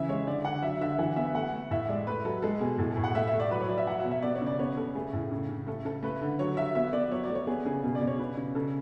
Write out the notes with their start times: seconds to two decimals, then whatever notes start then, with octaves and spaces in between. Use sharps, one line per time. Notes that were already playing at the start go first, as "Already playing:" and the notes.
Already playing: C#3 E3 E5
0.09 G#3 C#5
0.27 D3 D5
0.45 D3 F#5
0.63 F#3 E5
0.81 D3 E5
0.99 E3 F#5
1.16 B3 E5
1.35 A3 F#5
1.53 A3
1.71 A2 E5
1.89 G#3 D5
2.07 A3 B4
2.25 F#3 A4
2.42 G#3 A4
2.61 B2 G#4
2.78 A2 G#4
2.91 A4
2.97 A2
3.04 F#5
3.15 A3 E5
3.27 E5
3.33 A3
3.40 D5
3.51 F#3 B4
3.60 C#5
3.69 F#3 D5
3.78 E5
3.87 F#3 F#5
3.99 E5
4.05 B2
4.11 E5
4.22 B3 D5
4.35 C#5
4.42 C#3 D5
4.59 B3 C#5
4.77 C#3 A4
4.95 A3 G#4
5.13 A2
5.31 C#3
5.49 C#3
5.67 A3 A4
5.85 C#3 A4
6.03 A3 B4
6.21 D3
6.39 F#3 C#5
6.57 F#3 E5
6.75 B3 E5
6.93 B3 D5
7.11 F#3 C#5
7.23 D5
7.30 A3
7.35 C#5
7.47 B3 G#4
7.65 C#3 G#4
7.83 B2 G#4
7.95 D5
8.02 B2
8.07 C#5
8.19 C#3 B4
8.37 C#3
8.55 C#3 A4